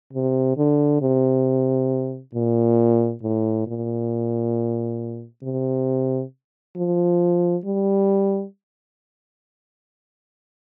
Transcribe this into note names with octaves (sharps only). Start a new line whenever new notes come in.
C3
D3
C3
A#2
A2
A#2
C3
F3
G3